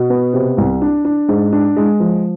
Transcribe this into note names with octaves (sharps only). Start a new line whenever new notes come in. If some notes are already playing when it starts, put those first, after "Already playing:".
Already playing: B2
B3
C3
C2
D4
D4
G#2
D4
G#3
F3